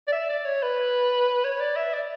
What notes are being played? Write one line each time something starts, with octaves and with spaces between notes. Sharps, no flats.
D5
E5
D5
C#5
B4
C#5
D5
E5
D5